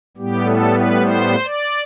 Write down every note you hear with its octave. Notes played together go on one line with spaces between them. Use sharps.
A2 G3 B3 G4
A4
B4
C5
D5